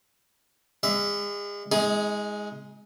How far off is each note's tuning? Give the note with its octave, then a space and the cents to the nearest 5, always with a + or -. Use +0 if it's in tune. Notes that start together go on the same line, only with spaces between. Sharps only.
G#3 -35 E5 -5
G#3 +0 D#4 +40 G#4 +0